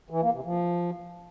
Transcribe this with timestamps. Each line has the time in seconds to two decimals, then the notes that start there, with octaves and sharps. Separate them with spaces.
0.10 E3
0.22 A#3
0.33 C3
0.45 F3